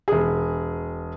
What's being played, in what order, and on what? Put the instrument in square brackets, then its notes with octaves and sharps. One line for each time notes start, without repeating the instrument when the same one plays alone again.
[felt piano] E1 G#4